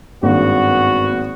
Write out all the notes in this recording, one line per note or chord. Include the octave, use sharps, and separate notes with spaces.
G#1 G2 A#3 B3 F#4